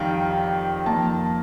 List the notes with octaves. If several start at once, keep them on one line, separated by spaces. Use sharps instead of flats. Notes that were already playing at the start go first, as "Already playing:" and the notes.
Already playing: F2 D#3 G3 F5 G5
F2 D#3 A#3 A5